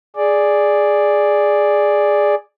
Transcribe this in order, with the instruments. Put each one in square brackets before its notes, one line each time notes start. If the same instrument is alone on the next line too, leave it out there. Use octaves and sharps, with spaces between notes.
[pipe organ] G#4 D5